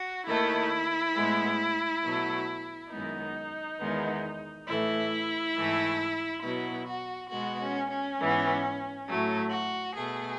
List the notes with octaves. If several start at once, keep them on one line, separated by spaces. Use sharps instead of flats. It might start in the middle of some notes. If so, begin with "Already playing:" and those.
Already playing: F#4
D#2 D#3 A3 E4
A2 G#3 B3
B2 F#3 A3
F#2 D#3 G#3 B3 D#4
E2 D#3 G#3 B3
A2 E3 A3 E4
G#2 E3 A3
B2 F#3 B3 E4
F#4
B2 G#3 B3 F#4
C#4
C#4
G#2 E3 B3
A2 F#3 A3
F#4
B2 A3 G#4